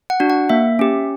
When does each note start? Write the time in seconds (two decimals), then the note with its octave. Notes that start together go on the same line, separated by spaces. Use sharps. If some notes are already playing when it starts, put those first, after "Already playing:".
0.10 F#5
0.20 D4 F#4
0.30 F#5
0.49 A#3 E5
0.79 C#4 G4